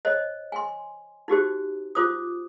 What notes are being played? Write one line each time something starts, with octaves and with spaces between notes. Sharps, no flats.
C5 C#5 D#5
G#5 C6
D#4 F#4 G4 C5
F4 C5 D6 D#6